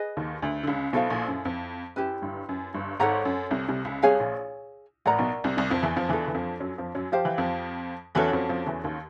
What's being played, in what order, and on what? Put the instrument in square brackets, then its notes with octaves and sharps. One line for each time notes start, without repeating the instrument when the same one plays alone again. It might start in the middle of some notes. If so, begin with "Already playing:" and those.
Already playing: [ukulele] G#4 B4 D#5 G#5
[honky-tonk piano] D#2 D#3
D2 D3
D3
C#2 C#3
[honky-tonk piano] B1 B2 [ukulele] E4 A4 C5 F5
[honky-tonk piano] A#1 A#2
F#2
F2
[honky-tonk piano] F#2 [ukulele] E4 G4 B4
[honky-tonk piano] G1 G2
F#2
G1 G2
[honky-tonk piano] G#1 G#2 [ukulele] A4 C#5 F#5 A#5
[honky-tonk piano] F#2
C2 C3
C2 C3
C#2 C#3
[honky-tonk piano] C2 C3 [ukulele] G#4 C#5 F5 G#5
[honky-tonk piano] A#1 A#2
[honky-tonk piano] A1 A2 [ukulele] A#4 D5 F#5 A#5
[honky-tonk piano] B1 B2
C2 C3
C2 C3
F2 F3
E2 E3
F2 F3
[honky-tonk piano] E2 E3 [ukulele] D4 F4 A4
[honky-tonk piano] E3
F2 F3
F#2 F#3
F2 F3
F#2 F#3
[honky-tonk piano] F3 [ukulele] G4 C5 F5
[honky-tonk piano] E3
F2 F3
[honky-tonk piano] E2 E3 [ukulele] C#4 F#4 A4 C#5
[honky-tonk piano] F2 F3
F2 F3
E2 E3
D#2 D#3